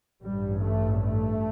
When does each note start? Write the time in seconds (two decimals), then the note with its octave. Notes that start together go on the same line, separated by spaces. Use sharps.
0.22 A1 G2 G3
0.64 A3
1.04 A3